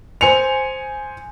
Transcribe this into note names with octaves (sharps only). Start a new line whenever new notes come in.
C5 G#5 C#7 F7